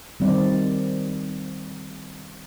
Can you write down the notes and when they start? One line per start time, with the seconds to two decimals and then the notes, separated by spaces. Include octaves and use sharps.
0.20 D#3 G3 C4 D5